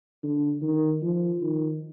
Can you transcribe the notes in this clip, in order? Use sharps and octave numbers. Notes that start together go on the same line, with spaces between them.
D3
D#3
F3
D#3